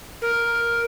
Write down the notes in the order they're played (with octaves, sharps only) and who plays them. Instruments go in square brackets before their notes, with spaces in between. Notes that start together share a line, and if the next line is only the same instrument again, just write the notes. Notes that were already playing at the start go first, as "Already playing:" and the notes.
[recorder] A#4